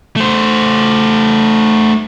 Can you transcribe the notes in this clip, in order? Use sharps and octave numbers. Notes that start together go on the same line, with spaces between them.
A3 C5